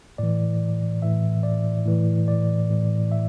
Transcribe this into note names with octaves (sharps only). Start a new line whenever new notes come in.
A2 E3 D5
A2 E3 E5
D5
A2 E3
D5
A2 E3
E5